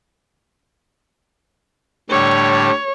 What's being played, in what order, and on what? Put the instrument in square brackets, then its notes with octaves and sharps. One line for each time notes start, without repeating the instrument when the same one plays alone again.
[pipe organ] A2 D3 G3 [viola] C#5